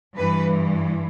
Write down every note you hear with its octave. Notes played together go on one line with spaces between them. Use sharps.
G2 E3 B4